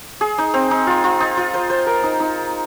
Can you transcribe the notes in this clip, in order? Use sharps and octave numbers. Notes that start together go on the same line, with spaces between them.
G#4
D#4
C4
D#4
F4
F4
D#4
F4
C5
C5
A#4
D#4
D#4